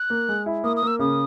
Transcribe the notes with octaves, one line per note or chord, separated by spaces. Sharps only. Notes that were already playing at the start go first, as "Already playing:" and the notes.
Already playing: F#6
A#3
G#3
E4
A#3 D#6
D#6
A#3 E6
C#3 D#6